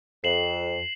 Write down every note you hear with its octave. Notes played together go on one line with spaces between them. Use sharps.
F2 C7 E7 F#7